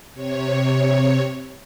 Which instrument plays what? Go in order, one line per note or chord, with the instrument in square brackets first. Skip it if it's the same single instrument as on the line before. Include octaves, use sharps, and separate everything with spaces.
[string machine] C3 C#5